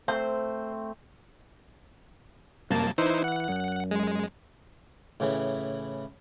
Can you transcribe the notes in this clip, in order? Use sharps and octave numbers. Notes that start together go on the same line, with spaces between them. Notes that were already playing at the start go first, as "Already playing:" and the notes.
A3 C4 C5
C2 F#2 A#3 A5
E3 D#4 E4 C5
F#5
F#2
G#3
A2 C#3 E3